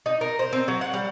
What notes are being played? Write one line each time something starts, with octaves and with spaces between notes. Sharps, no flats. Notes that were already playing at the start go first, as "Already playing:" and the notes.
D#4
A#4
C5
C4
F#3
F#5
G3